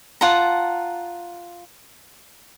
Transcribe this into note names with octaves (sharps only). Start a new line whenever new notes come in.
F4 F#5 A5 A#5